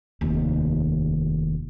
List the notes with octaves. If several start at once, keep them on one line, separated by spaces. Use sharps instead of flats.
F1 D#2